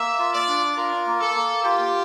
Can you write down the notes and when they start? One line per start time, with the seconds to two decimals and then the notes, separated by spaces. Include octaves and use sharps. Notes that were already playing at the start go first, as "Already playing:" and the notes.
Already playing: A#3 E5
0.19 F4
0.33 D5
0.48 D4
0.77 F4 A#4
1.07 A#3
1.20 A4
1.34 A#3
1.64 F4 G4